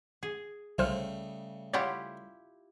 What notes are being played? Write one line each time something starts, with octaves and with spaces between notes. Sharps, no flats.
G#4
C2 C#3 G3 A3 C5 F6
E4 F4 G4 C#5 D5 F#5